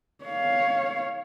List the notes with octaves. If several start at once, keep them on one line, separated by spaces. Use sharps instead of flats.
C#5 F5